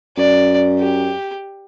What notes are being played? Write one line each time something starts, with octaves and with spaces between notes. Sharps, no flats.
F#2 D5
G4